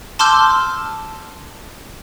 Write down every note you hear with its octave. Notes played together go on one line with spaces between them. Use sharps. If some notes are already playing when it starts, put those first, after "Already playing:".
A5 C6 D6 E6 F6 G6